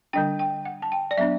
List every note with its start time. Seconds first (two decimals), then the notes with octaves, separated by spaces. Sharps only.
0.13 D3 G3 D4 G5
0.39 G5
0.65 F#5
0.82 A5
0.92 G5
1.11 D5
1.18 F#3 B3 D4 E5